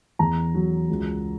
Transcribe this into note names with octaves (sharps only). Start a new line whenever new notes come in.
E2 A#5
F#3
C#2